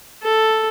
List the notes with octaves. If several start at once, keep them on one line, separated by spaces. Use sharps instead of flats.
A4